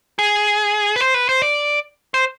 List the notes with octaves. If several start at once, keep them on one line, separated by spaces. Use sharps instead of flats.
G#4
B4
C5
B4
C5
D5
C5